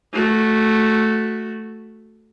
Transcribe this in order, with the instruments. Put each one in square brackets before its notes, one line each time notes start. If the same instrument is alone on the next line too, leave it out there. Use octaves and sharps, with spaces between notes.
[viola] A3 F#4